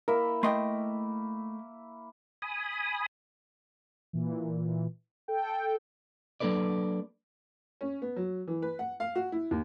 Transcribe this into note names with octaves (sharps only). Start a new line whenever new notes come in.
A#3 E4 A#4 E5
A3 D#5 G5 C6
G#5 B5 D#6
A#2 E3
A4 G5
F#3 A#3 D4 A4 B4 D5
C#4
B3
F#3
E3
B4
F#5
F5
F#4
E4
D#2